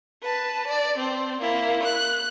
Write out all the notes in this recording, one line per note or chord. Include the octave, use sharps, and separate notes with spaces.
B4 A5
D5
C4
A#3 E4
F#6